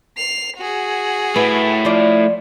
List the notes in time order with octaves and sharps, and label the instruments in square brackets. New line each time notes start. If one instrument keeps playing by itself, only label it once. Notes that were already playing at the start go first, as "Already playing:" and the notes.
[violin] C7 F7
F#4 G#4
[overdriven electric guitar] A3 E4 [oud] B4
[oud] F3 F4 D5